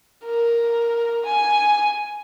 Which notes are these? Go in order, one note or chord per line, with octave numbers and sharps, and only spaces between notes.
A#4
G#5